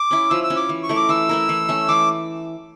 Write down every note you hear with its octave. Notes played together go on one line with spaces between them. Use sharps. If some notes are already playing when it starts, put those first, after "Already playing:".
Already playing: D6
C#4 E4
F3 E6
E6
C#4 E4
D6
E3
C#6
A3 E4 A#4
D6
E3 E6
A3 E4 A#4
E3
A3 C#4
E3 D6